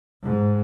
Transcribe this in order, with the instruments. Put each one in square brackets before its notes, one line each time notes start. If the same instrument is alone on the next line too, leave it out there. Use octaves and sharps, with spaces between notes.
[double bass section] G#2